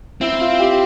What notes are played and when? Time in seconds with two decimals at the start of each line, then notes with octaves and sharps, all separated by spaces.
0.21 C4 E4
0.41 F4
0.59 G4